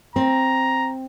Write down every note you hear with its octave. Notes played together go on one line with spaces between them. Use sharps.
C4 A#5